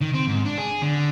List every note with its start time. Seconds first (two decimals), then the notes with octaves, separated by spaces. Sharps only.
0.02 D#3
0.14 C4
0.28 G#2
0.46 D4
0.58 G#4
0.82 D3